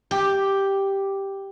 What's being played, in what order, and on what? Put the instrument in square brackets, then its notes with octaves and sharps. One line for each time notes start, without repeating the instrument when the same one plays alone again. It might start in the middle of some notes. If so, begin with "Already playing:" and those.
[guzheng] G4